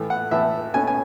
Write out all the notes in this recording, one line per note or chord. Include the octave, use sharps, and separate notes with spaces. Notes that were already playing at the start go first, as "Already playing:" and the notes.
Already playing: A2 E3 A3
F#5
A2 E3 A3 E5
B2 A3 C#4 G#5
G#5